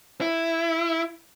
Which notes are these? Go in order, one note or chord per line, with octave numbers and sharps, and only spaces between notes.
E4